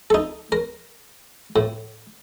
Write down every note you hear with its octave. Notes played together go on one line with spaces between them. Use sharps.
D#4 A4
A#4
A2